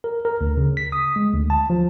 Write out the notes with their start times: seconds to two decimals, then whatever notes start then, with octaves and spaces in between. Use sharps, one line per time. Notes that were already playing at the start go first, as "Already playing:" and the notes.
0.04 A#4
0.25 A#4
0.41 D2
0.57 C#3
0.77 B6
0.92 D#6
1.16 G#3
1.33 D2
1.50 A5
1.70 F3